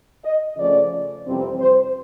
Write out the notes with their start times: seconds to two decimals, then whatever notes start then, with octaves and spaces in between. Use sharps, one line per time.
0.24 D#5
0.57 C#3 F3 A3 C#4 D5
1.25 F2 C3 E3 G3 C4
1.59 C5